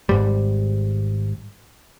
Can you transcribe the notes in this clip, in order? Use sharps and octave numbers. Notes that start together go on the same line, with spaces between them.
G#1 G#2 G3